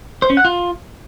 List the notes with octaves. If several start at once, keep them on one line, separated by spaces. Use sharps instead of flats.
C5
C#4
F#5
F4